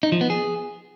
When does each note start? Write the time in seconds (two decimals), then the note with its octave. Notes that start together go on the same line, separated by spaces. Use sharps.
0.03 D#4
0.12 F3
0.21 B3
0.30 G#4